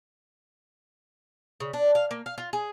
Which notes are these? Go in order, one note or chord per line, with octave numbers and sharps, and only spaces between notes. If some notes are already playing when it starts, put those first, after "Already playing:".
C#3
D4
F5
A#3
F5
F4
G#4